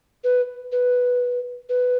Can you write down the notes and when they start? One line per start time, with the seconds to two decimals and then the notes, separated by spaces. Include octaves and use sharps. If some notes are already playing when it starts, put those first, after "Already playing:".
0.24 B4
0.72 B4
1.69 B4